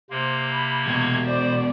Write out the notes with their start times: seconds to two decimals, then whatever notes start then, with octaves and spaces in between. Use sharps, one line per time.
0.10 C3 A#3 C5
0.50 B5
0.86 E2 B2 G#6
1.25 C5 D5